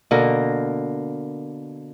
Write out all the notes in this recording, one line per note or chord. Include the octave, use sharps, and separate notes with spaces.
B2 D3 A#3 A#4